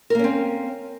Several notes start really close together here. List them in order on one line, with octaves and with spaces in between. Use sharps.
A#4 A#3 C#4 C4